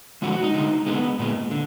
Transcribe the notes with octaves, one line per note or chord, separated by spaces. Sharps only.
D3 F3 G#3 F#4
F#4
D#4
D3 G#3
D3 G#3 B3
A#2 G#3
D3